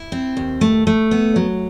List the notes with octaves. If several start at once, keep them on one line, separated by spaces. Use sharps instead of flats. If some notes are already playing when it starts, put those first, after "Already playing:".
Already playing: E4
C4
D#2
A3
A3
B3
F#3